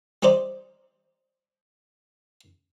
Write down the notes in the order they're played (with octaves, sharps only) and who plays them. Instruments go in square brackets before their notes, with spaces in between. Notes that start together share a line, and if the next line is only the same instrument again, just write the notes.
[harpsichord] G3 D#4 C5 D5